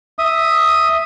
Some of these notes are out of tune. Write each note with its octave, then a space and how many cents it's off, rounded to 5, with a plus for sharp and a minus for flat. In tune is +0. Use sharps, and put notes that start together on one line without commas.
E5 +0 D#6 +0